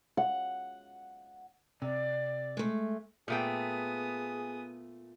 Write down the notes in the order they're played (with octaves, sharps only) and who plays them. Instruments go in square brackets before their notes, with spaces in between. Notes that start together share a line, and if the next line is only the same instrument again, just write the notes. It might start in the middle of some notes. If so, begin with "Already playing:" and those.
[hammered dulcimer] F#5
[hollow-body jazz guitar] C3 [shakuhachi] D5
[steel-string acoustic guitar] G#3 A3
[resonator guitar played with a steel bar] A#2 A3 G5 [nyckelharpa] B3 D#6 [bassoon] G#4